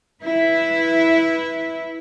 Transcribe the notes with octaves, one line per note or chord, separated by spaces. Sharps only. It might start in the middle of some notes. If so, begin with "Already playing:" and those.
E4 B4